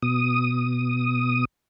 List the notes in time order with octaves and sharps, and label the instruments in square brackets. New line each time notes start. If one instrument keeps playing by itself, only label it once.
[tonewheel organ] B2 D#6